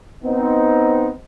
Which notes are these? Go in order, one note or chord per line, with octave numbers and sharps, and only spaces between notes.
B3 C4 D#4